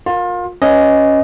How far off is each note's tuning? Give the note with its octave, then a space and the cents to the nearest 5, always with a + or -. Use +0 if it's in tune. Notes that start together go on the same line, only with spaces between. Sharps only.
F4 +30 A#4 +0
C#4 +0 B4 +0 D#5 +0